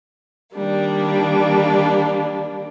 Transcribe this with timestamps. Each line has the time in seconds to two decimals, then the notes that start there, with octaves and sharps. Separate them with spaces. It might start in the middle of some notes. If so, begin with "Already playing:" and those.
0.55 D#3 G3 A#3 D4